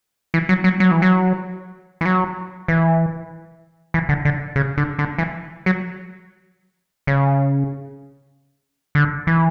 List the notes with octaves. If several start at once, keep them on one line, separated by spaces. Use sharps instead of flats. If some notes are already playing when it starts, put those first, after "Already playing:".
E3
F#3
F#3
F#3
E3
F#3
E3
F#3
E3
E3
D3
D3
C#3
D3
D3
E3
F#3
C#3
D3
E3